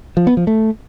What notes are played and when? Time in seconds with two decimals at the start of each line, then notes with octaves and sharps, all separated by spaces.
0.17 F3
0.27 B3
0.37 F3
0.47 A3